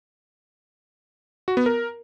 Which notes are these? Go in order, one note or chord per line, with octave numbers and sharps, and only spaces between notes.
F#4
B3
A#4